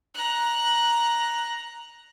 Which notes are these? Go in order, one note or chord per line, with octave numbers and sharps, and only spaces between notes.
A#5 F#6